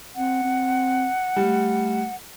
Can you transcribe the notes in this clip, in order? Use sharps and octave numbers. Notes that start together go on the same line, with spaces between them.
C4 F#5
C4
G3 A3